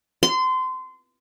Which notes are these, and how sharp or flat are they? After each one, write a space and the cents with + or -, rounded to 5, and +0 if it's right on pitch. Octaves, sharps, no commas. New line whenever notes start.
C6 -25